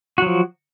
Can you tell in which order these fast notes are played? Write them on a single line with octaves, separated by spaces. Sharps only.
F#4 F#3 F3